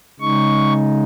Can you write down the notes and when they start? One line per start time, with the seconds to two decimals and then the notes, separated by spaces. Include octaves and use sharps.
0.20 C#3 G#3 D#4 C#6